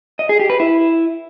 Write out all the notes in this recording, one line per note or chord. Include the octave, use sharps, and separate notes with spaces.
D#5
G#4
G4
B4
E4